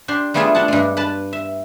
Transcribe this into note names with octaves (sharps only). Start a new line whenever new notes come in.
D4 G4 C6
G3 A3 B3 F4 G#4 E5
D4 E5 F#5 A5
G2 G#3
B4 A5
E5